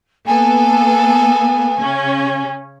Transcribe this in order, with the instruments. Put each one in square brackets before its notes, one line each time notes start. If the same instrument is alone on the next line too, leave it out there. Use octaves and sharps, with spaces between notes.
[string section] A#3 B3 A4 [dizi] G#5
[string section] C#3 C#4